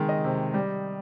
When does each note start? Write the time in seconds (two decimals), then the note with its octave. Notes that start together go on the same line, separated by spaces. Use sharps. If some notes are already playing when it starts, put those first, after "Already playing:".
Already playing: C3 D#3 G#3
0.09 D#5
0.24 C3
0.54 G3